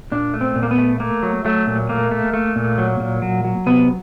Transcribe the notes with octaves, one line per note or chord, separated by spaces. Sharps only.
A#2 D4
A3
C4
A#2
A#3
B3
A3
A3 A#3
F#3
F#3 A3
A#2
A3 A#3
A3
A3
A#2
F#3
A#2
F#3
F#3
C3 B3